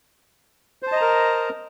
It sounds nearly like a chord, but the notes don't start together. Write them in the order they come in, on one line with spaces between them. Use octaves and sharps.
C5 A5 D#5 A#5 A#4